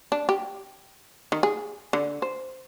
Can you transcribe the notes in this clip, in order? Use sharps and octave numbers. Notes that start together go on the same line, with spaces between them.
D4
G4
D#3
G#4
D3
C5